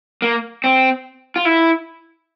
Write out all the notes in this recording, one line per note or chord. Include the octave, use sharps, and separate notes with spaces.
A#3
C4
F4
E4